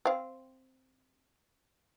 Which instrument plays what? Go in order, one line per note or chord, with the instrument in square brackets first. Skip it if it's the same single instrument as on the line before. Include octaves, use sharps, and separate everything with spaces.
[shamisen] C4 F5